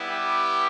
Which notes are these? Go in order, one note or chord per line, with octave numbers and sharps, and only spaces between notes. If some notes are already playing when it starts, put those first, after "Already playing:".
Already playing: G3 B3 E4
G4